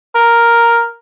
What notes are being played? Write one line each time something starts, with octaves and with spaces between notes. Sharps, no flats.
A#4